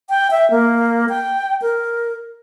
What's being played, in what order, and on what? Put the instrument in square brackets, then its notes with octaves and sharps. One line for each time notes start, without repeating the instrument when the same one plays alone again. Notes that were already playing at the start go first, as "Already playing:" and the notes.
[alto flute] G5
E5
A#3
G5
A#4